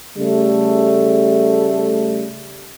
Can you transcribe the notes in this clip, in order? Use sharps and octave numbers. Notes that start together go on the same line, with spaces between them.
C#3 G3 A3